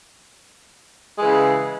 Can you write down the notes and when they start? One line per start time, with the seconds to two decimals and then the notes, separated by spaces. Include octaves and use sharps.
1.18 G#3
1.21 E3
1.24 C#3